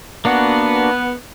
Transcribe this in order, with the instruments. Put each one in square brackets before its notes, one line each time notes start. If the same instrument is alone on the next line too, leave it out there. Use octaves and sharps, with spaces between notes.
[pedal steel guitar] A#3 D4 F#4 [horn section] B3